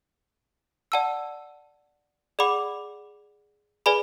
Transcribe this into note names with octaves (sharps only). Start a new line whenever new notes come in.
D5 F#5 A5 E6
G#4 D5 F#5 B5 D6
G#4 B4 D5 G#5 B5